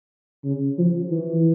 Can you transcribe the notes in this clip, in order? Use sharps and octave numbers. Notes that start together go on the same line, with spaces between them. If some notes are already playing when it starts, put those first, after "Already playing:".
C#3
F3
E3